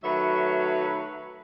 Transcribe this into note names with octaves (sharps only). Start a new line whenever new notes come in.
D#3 F#3 A3 B4 C#5 E5